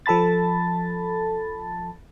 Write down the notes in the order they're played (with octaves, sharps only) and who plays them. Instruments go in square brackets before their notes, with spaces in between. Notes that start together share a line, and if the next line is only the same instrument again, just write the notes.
[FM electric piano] F3 A4 A5 B5 A6